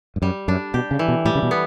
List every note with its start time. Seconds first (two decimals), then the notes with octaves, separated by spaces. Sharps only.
0.16 G2
0.22 F#2 G3
0.48 F#2 D4
0.74 B2 G4
0.91 C#3
0.99 E3
1.08 B2
1.25 A2 G3
1.35 C#3
1.43 B2
1.51 B3